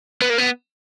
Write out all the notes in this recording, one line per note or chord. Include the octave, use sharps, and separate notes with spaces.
B3
A#3
B3